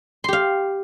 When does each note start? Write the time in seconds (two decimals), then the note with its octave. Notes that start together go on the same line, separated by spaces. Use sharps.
0.24 C6
0.28 G4
0.33 F5